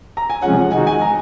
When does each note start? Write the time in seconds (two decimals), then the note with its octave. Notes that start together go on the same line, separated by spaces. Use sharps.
0.17 A#5
0.30 G#5
0.42 C3 F3 G#3 C#4 F#5
0.72 D#3 G#3 D#4 F#4 G#5
0.87 G#5
1.01 A#5